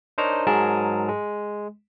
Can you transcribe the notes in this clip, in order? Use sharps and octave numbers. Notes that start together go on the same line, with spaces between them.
D4 D#4 A#4 C5 C#5 A#5
G#2 F#3 G#3 G#4 A#4 A5
G#3